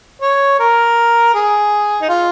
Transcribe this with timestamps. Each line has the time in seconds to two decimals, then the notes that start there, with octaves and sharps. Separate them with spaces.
0.21 C#5
0.59 A#4
1.34 G#4
2.01 D#4
2.09 F4